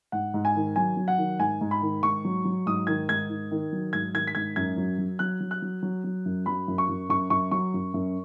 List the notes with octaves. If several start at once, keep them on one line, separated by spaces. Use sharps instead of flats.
G#2 F#5
G#2
G#5
D#3
F#3 G#5
F#3
F#5
D#3
G#2 G#5
G#2
B5
D#3
G#2 C#6
F#3
F#3
G#2 D#6
D#3 G#6
G#2 G#6
D#3
D#3
F#3
G#2 G#6
D#3 G#6
B6
G#2 G#6
F#2 G#6
F#3
F#3
F#3 F#6
F#3
F#6
F#3
F#3
F#3
F#2
F#3 B5
F#2
C#6
F#2
F#2 C#6
F#2 C#6
F#3 C#6
F#2
F#2